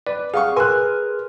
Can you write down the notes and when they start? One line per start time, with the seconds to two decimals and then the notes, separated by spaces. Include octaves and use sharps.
0.07 B4 D5
0.34 G#4 F5 F#5 C#6
0.56 A#4 B4 G#5 C6 F#6